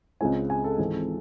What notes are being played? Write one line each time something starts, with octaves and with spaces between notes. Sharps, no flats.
C#2 C#3 G#3 C4 G#5
G#5
A4
G#1 G#2 E3 C4 A4